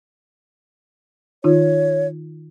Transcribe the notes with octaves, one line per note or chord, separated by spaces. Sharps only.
D#3 D#4 F4 C#5